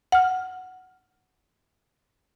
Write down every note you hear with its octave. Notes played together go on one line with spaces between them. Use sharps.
F#5 F6